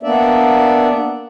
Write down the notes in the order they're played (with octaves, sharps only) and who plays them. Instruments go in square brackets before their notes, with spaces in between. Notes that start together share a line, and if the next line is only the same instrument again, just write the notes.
[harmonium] A#3 B3 D4 D5 E5